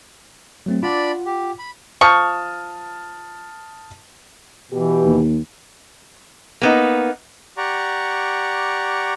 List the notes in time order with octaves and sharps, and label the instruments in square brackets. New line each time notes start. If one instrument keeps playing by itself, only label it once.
[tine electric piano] F#3 A3 C4
[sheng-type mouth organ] D4 D5 B5 [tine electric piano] F4 F#5
[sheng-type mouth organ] G4
B5
[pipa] F3 C#6 [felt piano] A5 D#6 F6
[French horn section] B2 G4 [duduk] E3
[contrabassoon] D#2
[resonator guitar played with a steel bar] A#3 B3 D#4
[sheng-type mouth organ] G4 D5 F#5 A#5 C#6